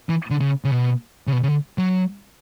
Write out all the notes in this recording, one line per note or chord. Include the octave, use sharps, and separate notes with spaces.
E3
D3
C#3
C#3
B2
C#3
B2
C#3
D3
F#3